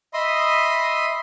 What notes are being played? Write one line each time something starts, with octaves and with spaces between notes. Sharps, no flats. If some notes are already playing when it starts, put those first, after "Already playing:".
D#5 E5 B5 C6 D#6